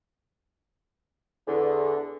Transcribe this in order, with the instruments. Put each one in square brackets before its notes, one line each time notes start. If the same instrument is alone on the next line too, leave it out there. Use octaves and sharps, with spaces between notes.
[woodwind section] E2 D3